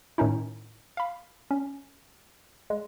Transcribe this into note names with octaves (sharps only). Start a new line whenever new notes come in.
A2 D#3 C#4 D#4 E4
F5 B5
C#4
G#3